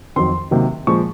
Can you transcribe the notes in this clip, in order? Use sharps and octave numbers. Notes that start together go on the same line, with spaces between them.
F2 D#3 F#3 C6
C3 D#3 F#3 A#3
A#2 F3 G#3 C#6